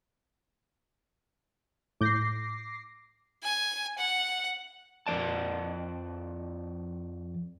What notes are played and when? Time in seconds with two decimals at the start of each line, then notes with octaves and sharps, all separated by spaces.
2.01 A2 D6 G6 A#6 C7
3.43 G#5
3.98 F#5
5.07 F2 G#3 D5 A5